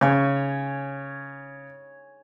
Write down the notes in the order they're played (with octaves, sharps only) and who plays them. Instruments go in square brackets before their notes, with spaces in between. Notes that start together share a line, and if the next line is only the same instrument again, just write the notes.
[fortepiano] C#3 [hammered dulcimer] C#5 G#5